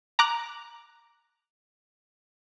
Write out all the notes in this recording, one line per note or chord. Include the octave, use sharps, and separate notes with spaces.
A#5 D6 F#6